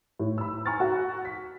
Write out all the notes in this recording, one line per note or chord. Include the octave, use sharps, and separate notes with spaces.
A2
B5 E6
G#5 A#5 C#6 E6 F6 A6
F#4
B6